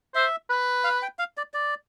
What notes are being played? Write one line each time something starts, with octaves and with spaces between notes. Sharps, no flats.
C5 E5
B4
F5
G5
F5
D5
D5